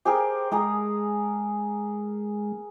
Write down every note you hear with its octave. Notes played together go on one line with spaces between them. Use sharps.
G4 G#4 A#4 C5
G#3 G#4 A#5 D#6